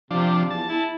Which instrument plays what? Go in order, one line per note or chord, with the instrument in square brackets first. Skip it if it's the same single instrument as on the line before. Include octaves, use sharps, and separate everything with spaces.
[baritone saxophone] C3 [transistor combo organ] F3 D4
[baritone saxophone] E2 [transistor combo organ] A5
[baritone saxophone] E4